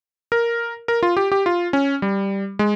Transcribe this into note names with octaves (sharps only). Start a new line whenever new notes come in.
A#4
A#4
F4
G4
G4
F4
C#4
G3
G#3